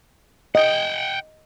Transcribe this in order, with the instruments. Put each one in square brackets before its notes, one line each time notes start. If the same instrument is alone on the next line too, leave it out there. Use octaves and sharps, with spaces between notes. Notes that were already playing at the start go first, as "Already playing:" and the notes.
[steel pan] D#5 [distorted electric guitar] F#5 G5